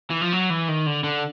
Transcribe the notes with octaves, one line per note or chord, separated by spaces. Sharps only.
E3
F3
F#3
E3
D#3
D3
D3